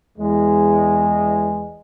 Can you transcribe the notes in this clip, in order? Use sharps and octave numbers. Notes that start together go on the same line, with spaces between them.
E2 G#3